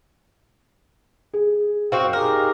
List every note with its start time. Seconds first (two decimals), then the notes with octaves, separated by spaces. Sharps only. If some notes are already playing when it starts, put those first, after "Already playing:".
1.33 G#4
1.92 F#2 C4 F#4 F5 G5
2.13 D#4 G4 G#4 A#4